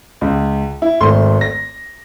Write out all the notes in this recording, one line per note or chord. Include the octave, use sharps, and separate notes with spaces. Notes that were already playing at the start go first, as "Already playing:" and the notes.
C#2
E4
G#1 A3 C6
A#6